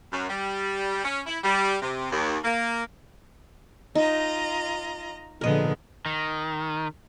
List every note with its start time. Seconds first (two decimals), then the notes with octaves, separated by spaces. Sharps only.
0.12 F#2
0.29 G3
1.04 C#4
1.27 E4
1.44 G3
1.82 C3
2.11 D#2
2.43 A#3
3.95 D#4 F4 D#5 A#5
5.41 A#2 D3 F3 G#3 B3 A#4 D#5
6.06 D#3